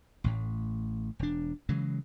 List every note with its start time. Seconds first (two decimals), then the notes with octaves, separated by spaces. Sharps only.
0.24 A1 A2
1.19 E1 D4
1.69 C#3 E3 F#3 G#3